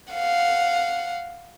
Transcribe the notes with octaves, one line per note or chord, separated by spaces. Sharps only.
F5 F#5